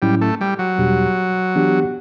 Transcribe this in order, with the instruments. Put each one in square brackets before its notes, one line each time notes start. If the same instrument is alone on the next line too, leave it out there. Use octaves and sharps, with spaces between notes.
[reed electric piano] A2 F#3 C#4 E4 [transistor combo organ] G3
[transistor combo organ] A3
G3
F#3
[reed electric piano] E2 B2 G3 D4 G4
E3 B3 D4 G4